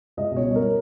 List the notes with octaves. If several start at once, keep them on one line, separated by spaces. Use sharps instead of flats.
C#2 D#5
B2
C#5
G3
A#4